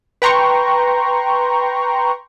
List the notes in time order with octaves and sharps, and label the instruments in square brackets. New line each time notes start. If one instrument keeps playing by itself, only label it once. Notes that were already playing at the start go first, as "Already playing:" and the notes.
[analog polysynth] B4 G5 A#5 C6 C#6